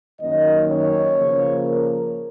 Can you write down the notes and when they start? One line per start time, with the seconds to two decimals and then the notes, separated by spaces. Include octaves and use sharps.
0.20 F#2 D#3 A#3 C#4 D#5
0.68 C#5
1.15 C#3 F3 A#3
1.63 A#4